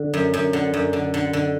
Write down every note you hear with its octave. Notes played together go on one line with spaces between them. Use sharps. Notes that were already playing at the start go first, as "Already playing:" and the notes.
Already playing: D3
F#2
F#2
D3
F#2
D3
D3
D3